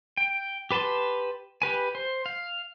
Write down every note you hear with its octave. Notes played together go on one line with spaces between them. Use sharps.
G5
G4 B4 A5 C6
G4 B4 G#5
C5
F5